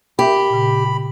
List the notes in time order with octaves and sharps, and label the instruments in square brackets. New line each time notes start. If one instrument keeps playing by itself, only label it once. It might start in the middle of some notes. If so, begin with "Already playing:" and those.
[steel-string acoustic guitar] G4 [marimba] A#4 E5 G5 [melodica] B5
[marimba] A#2 C#3